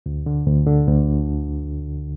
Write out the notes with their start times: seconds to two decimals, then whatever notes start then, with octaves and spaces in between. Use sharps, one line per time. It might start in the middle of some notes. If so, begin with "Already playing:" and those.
0.06 D2
0.26 D3
0.47 D2
0.66 D3
0.87 D2